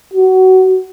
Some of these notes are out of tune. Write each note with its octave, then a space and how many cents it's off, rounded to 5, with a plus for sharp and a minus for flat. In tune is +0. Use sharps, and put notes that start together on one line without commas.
F#4 +20